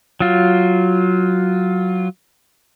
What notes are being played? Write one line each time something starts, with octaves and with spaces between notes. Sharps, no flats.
F#3 F4